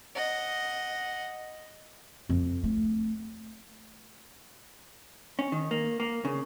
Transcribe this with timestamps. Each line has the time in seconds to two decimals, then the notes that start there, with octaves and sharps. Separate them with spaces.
0.15 D#5 F#5
2.29 F2
2.63 A3
5.39 C#4
5.52 D#3
5.71 A#3
6.00 A#3
6.25 C#3